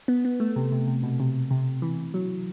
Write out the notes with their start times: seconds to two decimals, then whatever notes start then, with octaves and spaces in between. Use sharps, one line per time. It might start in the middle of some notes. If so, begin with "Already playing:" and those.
0.08 B3
0.25 B3
0.40 A3
0.56 C3
0.72 C3
0.87 C3
1.03 B2
1.20 C3
1.51 C3
1.82 E3
2.14 F#3